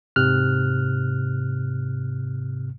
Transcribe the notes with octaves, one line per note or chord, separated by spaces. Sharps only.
G#2 C3 F6 F#6